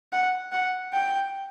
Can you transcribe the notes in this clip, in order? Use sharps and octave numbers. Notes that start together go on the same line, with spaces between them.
F#5
F#5
G5